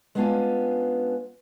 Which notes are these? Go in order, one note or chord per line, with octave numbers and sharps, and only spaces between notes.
G#3 B3 C#4 D4 F4 G#5